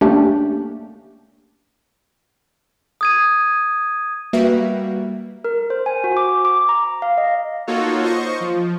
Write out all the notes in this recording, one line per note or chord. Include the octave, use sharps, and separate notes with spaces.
A3 A#3 C#4 D4 G4
D#6 G#6 D#7
G3 A#3 F#4 B4 E5
A#4
C5
G#5
F#4
D6
D6
A#5
F5
D#5
A#3 D#4 F4 F#4 A4 C#5
C5 D#5 C#6
F3